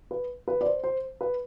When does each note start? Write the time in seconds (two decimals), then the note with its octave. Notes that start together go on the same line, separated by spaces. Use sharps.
0.11 B4
0.48 B4
0.61 D5
0.66 C5
0.83 C5
1.21 B4